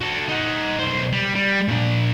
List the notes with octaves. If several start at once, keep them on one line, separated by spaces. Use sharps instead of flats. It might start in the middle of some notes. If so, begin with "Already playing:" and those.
F#4 A4
D#4 F#5
B1 C5
G3
G3
A#2 D4